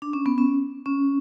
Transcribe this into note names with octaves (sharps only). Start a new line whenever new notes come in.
D4
C#4
B3
C#4
C#4